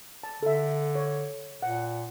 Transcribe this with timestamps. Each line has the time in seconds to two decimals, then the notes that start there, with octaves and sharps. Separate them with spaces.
0.24 A5
0.43 D3 A4 E5
0.95 C#5
1.63 A#2 F#5